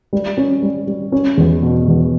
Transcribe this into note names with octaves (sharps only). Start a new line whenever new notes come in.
G3
C#4
G3
G3
C#4
E2
B2
E2